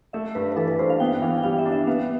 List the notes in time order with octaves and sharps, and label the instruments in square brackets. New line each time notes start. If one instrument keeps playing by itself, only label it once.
[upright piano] A3 [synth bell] E5
[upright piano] G2 [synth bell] B4
[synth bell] B4
[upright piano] E3 [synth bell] A4
[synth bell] B4
[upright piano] G2 [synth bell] C5
[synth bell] F5
[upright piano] B3 [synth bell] G5
[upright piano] E3 [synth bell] F5
[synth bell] G5
[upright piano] G3 [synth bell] F5
[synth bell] E5
[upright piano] D4
[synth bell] E5
[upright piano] B3 [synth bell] F5